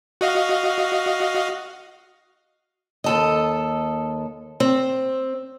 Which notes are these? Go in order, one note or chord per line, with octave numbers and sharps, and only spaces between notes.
F#4 D#5 F5
D#2 A4 D#5
C4